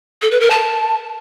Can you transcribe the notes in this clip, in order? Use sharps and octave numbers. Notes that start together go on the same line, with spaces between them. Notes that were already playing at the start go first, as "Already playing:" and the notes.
A4
B4
A#4
A5